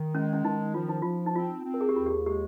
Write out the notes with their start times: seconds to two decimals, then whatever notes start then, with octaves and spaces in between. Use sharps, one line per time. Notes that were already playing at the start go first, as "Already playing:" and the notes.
Already playing: D#3
0.14 G#3 C#4
0.33 C#4
0.44 D#3 D#4
0.74 F3 F4
0.89 D#4
1.02 F3 F4
1.26 D#4
1.35 C4 F4
1.65 C4
1.74 A#4
1.81 G#4
1.89 G4
1.95 D#2 F4
2.06 G4
2.10 G#4
2.26 G#3 G4